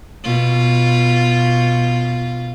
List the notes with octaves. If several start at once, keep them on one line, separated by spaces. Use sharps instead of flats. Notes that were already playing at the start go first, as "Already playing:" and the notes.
B2 F4